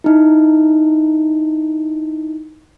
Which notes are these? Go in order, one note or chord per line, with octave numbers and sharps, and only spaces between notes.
D#4 E4